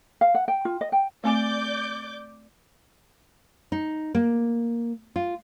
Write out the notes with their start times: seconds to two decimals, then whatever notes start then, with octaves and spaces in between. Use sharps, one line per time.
0.21 F5
0.35 F#5
0.48 G5
0.65 F4
0.81 D#5
0.92 G5
1.24 A3 C4 D5 G#5 D6 G6
3.72 D#4
4.15 A#3
5.16 F4